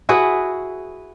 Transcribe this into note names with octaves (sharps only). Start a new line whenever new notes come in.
E4 F#4 G#4 B4